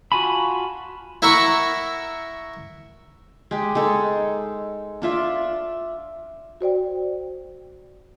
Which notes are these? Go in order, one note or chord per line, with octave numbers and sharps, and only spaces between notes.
F4 F#4 G#5 A5 B5
E4 A#4 E5 F#5 A#5 C#6
G#3 G4
G#3 D#4 A4
D4 F4 E5
F#4 C5 D5 G5